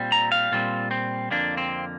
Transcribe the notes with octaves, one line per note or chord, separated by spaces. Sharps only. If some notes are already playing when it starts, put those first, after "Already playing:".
Already playing: A#2 G3 C4
A#5
F5
A#2 G3 C4 F4
C4
F2 D3 A#3 D4
C4